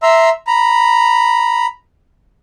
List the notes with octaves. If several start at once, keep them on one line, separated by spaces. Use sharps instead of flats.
E5 A#5 C6 E6
A#5 B5